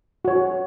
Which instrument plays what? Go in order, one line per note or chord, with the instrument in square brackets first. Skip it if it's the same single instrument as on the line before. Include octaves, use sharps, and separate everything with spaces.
[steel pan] F#4 C#5